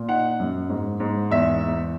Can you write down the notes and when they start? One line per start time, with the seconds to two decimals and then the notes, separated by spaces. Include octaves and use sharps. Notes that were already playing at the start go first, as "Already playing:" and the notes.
Already playing: A#2
0.09 D#4 F#5
0.40 F#2
0.69 G#2
1.00 G#2
1.30 E2 E5
1.62 E2